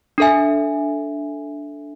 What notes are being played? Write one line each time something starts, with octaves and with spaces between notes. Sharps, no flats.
D4 A4 E5 G#5